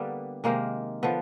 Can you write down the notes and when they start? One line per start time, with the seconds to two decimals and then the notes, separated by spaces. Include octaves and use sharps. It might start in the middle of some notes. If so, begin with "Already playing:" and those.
Already playing: D3 G3 A#3 B3
0.44 C3 D#3 G#3 A#3
1.03 D3 F3 B3